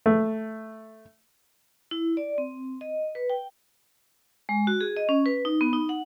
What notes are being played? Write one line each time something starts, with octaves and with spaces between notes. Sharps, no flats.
A3
E4
D5
C4
D#5
B4
G5
G#3
F#4
G#4
D#5
C#4
B4
D#4
B3
D#4
F#5